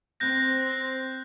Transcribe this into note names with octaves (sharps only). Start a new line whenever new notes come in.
C4 F#6 G6 A#6